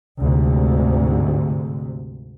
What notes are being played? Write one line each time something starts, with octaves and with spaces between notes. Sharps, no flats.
D2 G#2 C3